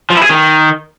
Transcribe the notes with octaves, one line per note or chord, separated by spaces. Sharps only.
F3
E4
G#4
D#3